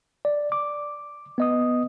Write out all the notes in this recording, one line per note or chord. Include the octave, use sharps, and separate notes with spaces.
D5
D6
B3 D#5 D#6